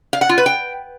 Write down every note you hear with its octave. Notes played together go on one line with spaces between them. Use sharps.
F5
F#5
F4
B4
G5